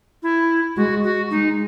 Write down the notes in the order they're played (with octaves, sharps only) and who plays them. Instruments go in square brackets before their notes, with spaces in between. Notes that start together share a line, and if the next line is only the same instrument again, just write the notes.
[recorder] E4
[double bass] G#3 [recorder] F#4
[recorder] F#4
[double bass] G#3 [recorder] D#4